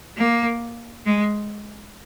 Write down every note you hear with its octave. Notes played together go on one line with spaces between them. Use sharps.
A#3
G#3